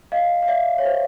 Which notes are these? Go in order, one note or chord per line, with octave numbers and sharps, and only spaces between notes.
D#5 F5
F5
D5 E5
C#5
C5 D5